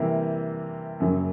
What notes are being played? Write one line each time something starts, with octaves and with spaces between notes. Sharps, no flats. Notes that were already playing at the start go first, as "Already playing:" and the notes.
Already playing: C3 E3 G3 A#3 E5
F#2 C#3 F#3 A#3